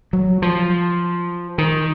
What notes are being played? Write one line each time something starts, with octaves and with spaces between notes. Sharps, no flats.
F#3
F3
D#3